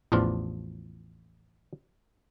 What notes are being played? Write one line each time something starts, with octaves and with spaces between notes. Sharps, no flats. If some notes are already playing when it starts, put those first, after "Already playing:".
A1 E2 F3 D4 F4